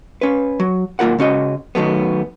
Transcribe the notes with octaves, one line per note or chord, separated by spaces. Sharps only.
C#4 B4
F#3
B1 A#3 F4 A#4 F#5
C#3 C#4 F#4 D#5
D#3 F#3 A3 B3